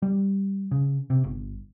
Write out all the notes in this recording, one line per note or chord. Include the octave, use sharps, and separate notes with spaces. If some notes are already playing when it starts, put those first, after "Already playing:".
G3
C#3
C3
G1